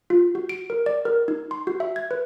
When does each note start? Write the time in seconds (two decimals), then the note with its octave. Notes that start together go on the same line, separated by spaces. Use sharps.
0.10 F4
0.35 F#4
0.49 D7
0.70 A#4
0.86 D5
1.05 A#4
1.28 D#4
1.51 C6
1.67 F#4
1.80 E5
1.96 G#6
2.11 B4